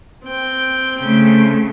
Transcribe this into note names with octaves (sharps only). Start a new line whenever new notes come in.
C4 G5
C#3 A3